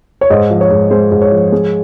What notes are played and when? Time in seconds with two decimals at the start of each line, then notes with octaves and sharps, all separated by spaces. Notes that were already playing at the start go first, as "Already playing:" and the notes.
0.21 C#5
0.30 G#2 C5 D#5
0.50 F3
0.61 C#5
0.71 G#2
0.91 G#3 C5
1.11 G#2
1.21 C#5
1.32 F3
1.52 G#3